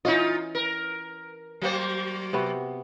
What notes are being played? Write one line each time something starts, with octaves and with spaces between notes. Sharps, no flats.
E3 C#4 D#4 F4 D#5
A#4
F#3 A#3 C5
C3 B3 F#4